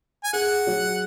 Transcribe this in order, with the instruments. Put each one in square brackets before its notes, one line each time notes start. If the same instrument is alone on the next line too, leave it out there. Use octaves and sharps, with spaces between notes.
[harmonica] G#5
[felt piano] G#4 [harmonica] F#5
[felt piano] F#3